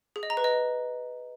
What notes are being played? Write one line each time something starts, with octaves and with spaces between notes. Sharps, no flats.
G#4
D#5
A#5
B4
D#5